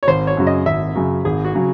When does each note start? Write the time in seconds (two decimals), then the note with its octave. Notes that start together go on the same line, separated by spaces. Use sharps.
0.03 C#5
0.07 G#1 C5
0.27 C#5
0.37 F#2 C#3 F#3
0.47 D#5
0.66 G#1 E5
0.95 F#2 C#3 F#3
1.25 G#1 G#4
1.45 F#4
1.55 C#3 F#3